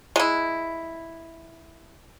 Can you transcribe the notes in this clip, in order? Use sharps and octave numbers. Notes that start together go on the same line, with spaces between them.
G#3 E4